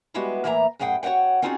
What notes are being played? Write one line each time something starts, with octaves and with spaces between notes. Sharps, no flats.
G3 G#3 B3 E4 F#4 G4
A2 E3 A#3 E5 A5 A#5
F#2 A2 G#4 F#5 G5
F#4 C#5 D5 F#5 G5
C4 C#4 D#4 F4 F#4 G#4